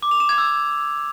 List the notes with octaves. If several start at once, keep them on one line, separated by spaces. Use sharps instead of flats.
D6
F7
E7
G#6
E6